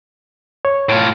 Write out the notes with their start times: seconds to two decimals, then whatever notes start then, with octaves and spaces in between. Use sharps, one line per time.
0.65 C#5
0.89 A2 F4